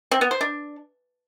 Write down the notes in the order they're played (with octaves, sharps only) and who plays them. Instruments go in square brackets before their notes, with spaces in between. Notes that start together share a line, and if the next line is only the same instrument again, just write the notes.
[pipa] C4
B3
C5
D4